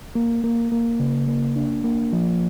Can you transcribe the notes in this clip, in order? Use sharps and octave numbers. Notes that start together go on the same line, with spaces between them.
A#3
A#3
A#3
C#3
A#3
D4
A#3
F3